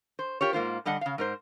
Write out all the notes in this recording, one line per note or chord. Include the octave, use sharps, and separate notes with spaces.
C5
F4 G4 A#4 C#5
G#2 A#3 F4 C5
D3 G3 D4 D#5 F#5
C#3 F5
G#2 A#4 C5